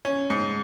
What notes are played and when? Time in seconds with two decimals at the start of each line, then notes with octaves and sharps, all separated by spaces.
0.05 C#4
0.30 G#2